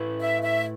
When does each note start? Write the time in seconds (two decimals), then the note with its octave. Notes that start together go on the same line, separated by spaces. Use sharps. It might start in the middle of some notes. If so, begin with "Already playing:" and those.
Already playing: A2 A3 E4 B4
0.21 E5
0.43 E5